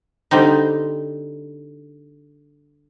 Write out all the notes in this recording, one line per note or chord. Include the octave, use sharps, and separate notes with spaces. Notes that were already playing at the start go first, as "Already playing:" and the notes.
D3 G3 C4 D#4